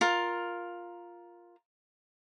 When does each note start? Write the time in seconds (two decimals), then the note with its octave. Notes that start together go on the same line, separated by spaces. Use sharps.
0.01 F4 A#4